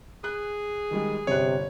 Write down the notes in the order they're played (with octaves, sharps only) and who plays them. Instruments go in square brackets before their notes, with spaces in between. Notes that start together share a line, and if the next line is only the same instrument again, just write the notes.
[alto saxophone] G#4 [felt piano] F#6
[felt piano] D#3 G3 G#3
[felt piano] G1 F#6 [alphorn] C3 [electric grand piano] C#5